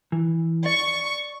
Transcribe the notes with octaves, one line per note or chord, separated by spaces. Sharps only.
E3
D5 C#6